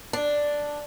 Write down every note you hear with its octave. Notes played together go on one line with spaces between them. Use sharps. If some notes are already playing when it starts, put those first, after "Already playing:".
D4